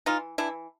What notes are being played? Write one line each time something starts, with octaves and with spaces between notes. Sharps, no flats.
E3 D#4 F4
E3 D4 E4